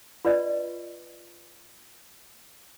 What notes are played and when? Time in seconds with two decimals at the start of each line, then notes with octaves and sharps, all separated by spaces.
0.25 F4 B4 D5 D#5